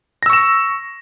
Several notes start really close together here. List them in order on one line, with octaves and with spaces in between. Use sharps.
A#6 E6 C#6 E7